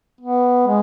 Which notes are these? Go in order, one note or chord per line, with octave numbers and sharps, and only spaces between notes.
B3
G#3